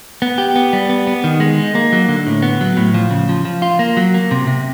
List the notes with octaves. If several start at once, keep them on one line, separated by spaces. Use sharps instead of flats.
B3
G4
B3
G3
B3
B3
D#3
G#3
D#4
A#3
F#3
D3
A2
B3
F#3
A2
F3
C#3
F3
F3
F4
A#3
F#3
A#3
C3
C3